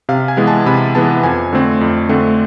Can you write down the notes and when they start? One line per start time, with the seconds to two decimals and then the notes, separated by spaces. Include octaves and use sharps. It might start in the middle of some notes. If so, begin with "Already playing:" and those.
0.09 C3 F5
0.28 G#5
0.37 E3 G#3 B3
0.47 A5
0.66 C3 B5
0.95 E3 G#3 B3 A5
1.24 F2 G#5
1.53 D3 A3 C4
1.81 F2
2.09 D3 A3 C4